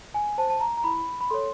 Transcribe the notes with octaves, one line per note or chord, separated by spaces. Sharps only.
G#5
C5 A5
A5
A#5
A#5
E4 B5
B5
A4 C#5 C6